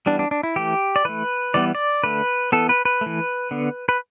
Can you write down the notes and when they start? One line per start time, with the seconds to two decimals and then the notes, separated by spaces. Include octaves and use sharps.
0.06 E3 G3 B3 D4
0.19 D4
0.31 D4
0.43 E4
0.56 E3 A3 G4
0.96 D5
1.05 E3 A3 B4
1.54 E3 G3 B3 D5
1.75 D5
2.03 D3 A3 B4
2.52 E3 B3 A4
2.69 B4
2.85 B4
3.01 E3 A3
3.51 D3 B3
3.89 B4